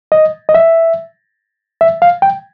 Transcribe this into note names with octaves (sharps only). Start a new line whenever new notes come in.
D#5
D#5
E5
E5
F5
G5